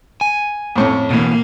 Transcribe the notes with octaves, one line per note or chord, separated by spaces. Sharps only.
G#5
F2 A2 C#4
B2 E3 A#3